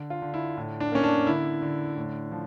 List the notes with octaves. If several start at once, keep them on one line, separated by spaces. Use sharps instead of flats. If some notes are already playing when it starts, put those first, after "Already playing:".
Already playing: D3
F4
D3
E4
A2
D4
A#3 C#4
D4
D3 E4
D3
A2
F3